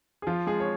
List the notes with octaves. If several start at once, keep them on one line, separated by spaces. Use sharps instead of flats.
G#4
F3 F4
G#3 G#4
C#5